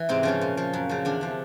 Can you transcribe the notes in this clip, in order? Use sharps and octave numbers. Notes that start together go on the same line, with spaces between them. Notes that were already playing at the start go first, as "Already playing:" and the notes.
Already playing: E3
G#2 C3 C4
C#3 F3 C#4
A#2
F3
F#2
C#3 F3
E2 D3 D4
C3 F3